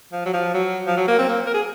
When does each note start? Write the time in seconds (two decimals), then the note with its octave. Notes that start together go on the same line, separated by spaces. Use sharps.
0.12 F3
0.26 F#3
0.33 F3
0.54 F#3
0.87 F3
0.97 F#3
1.08 A#3
1.19 C4
1.29 A#3
1.46 A#4
1.54 G#4